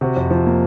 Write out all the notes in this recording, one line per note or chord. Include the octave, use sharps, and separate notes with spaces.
C3 F#4
F2
F3
A#3